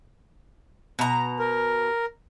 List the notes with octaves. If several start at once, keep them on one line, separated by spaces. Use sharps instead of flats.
B2 A#5
A#4